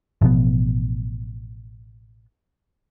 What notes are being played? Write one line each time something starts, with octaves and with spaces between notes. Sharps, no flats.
A1 B2 F3 B3